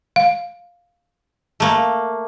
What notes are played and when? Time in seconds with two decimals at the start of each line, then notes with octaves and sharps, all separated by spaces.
0.16 F5
1.60 A3 A#3